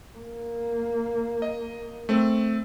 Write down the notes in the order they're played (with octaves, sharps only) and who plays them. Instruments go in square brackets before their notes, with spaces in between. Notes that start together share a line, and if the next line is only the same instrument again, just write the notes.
[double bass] A#3
[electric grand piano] D#5
A3 C4